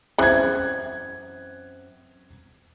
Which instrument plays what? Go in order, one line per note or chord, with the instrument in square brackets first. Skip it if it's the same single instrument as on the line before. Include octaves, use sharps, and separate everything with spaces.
[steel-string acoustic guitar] F#2 C4 [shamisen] C#3 E3 [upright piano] F#6 G#6